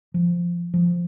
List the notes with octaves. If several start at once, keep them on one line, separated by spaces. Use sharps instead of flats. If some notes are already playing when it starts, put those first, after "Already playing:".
F3
F3